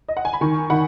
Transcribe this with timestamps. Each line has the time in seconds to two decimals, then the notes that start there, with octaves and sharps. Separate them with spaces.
0.08 D#5
0.17 F#5
0.25 G#5
0.33 B5
0.41 D#3 G#5 C#6
0.70 D#3 F#5 B5